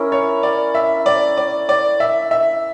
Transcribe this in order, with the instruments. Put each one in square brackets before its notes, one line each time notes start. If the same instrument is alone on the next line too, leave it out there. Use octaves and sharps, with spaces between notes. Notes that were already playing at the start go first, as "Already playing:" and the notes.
Already playing: [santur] C#4 E4 A#4
[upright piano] C#5
D5
E5
D5
D5
D5
E5
E5